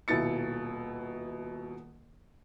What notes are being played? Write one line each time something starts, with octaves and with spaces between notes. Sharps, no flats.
D#1 B2 E4 A6 C#7